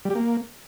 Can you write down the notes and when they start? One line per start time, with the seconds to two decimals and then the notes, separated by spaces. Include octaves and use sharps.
0.05 G3
0.10 G4
0.15 A#3